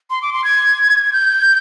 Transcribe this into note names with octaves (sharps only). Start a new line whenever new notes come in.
C6
D6
C6
G#6
G6